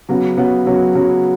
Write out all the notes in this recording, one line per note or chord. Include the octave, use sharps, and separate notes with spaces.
C#3 F#3 B3
C#3 F#3 B3
C#3 F#3 B3
C#3 F#3 B3